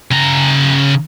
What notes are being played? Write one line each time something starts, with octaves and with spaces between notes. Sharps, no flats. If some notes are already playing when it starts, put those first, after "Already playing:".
C#3 A#5